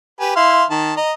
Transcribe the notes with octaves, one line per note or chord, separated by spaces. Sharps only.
G4 B4 G#5
E4 F5 C6
D#3 A5
D#5 A#5